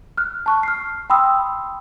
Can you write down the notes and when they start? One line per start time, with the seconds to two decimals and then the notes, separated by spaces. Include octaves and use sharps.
0.17 F6 F#6
0.46 A5 C#6 F#6
0.63 F6 C7
1.10 G5 B5 C6 D#6 E6